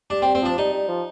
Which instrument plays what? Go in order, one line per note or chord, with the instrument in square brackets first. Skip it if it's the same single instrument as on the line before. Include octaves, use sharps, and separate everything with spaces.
[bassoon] G3 [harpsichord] D4
[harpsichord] C4
[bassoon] G3
[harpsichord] C4
[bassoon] F3 [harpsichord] D4
[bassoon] G3 [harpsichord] D#4
[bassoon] G3
F3